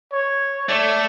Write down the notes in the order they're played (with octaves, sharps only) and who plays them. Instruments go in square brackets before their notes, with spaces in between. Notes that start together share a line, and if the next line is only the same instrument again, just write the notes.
[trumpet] C#5
[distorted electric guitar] A3 [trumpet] D5